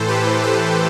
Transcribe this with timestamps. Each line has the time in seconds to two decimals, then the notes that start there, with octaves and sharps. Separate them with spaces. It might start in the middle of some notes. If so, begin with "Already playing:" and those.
Already playing: A2 E3 A4 C5
0.08 G4 B4
0.43 A4 C5